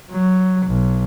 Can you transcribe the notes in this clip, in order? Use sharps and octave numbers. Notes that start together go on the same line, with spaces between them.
F#3
B1